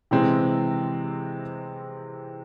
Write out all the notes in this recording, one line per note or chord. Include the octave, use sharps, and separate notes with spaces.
C3 E3 G#3 C4